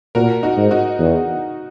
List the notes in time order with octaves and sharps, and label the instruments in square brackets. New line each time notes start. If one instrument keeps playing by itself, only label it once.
[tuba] A#2 [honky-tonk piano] F#4 A#4
[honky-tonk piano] D#4 F#4
[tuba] G#2
[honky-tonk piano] D#4 F#4
[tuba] E2